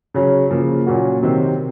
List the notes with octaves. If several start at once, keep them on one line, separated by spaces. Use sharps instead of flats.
C#3 F#3 C#4
C#3 F3 A#3
A#2 F#3 C#4 F#4
C3 D#3 F#3 C4